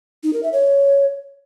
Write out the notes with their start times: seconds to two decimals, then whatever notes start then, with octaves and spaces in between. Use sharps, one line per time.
0.24 D#4
0.33 A#4
0.43 E5
0.53 C#5